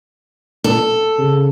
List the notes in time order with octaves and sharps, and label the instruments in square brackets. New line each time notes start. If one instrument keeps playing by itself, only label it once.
[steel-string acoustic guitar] A4
[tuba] C#3